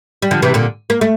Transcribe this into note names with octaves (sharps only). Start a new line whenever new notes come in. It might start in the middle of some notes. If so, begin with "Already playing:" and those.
G3
D3 F3
C3 E3
A#2 D3
A#3
A3